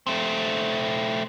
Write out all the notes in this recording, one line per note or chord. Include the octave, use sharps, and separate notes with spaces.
A3 C4